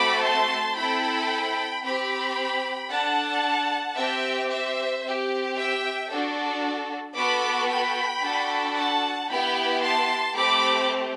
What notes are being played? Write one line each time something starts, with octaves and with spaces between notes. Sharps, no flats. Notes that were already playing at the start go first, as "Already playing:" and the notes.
Already playing: A3 C4 F#4 A4 B5 D6
A5 C6
C4 E4 A4 G5 B5
C4 G4 G5 B5
D4 A4 F#5 A5
C4 G4 E5 G5
C5 E5
C4 G4
E5 G5
D4 F#4 A4
B3 F#4 A4 B5 D6
G5 B5
D4 F#4 A4
F#5 A5
B3 E4 G4 G5 B5
A5 C6
A3 C4 G4 B5 D6